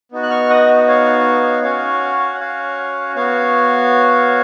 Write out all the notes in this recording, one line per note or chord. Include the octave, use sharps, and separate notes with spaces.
B3 D#4 F#4
F#6
C#6 F6
D#5 F#5
C#5 F5
C#4 F#4 C#5 F5
F#5
C#5 F5
B3 F#4 C#5 F5